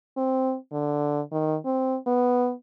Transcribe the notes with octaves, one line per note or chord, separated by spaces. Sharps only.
C4
D3
D#3
C4
B3